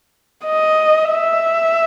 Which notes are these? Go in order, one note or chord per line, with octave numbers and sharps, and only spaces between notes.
D#5
E5